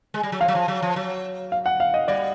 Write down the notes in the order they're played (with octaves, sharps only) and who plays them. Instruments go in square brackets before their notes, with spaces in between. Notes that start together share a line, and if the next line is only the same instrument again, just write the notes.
[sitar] G#3
G3
F#3
[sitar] F3 [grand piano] F5
[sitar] F#3
F3
F#3
F3
F#3
[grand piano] F5
F#5
F5
D#5
[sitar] G3 [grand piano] D5